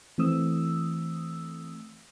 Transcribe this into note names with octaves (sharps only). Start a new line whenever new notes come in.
E3 A3 C4 D#6 E6